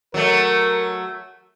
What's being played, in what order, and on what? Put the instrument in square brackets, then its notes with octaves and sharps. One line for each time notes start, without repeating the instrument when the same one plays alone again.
[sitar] F#3 A3 [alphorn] A#4